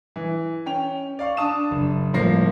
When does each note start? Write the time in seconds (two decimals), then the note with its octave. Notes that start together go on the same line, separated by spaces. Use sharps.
0.16 E3
0.66 C#4 G5 F7
1.19 D5 F5 C#6
1.37 D4 A5 D#6 E7
1.71 F#1
2.13 G1 A2 F3 A#3 A#6 C7